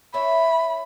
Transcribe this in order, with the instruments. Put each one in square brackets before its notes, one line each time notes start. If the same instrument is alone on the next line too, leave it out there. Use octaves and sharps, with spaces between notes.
[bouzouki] E4 C#5 E5 [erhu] B5